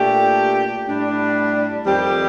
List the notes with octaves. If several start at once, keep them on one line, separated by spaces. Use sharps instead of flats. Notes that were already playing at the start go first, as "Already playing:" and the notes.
Already playing: A#2 A3 D4 G4
A2 G3 D4
F2 D#3 G3 C4 G4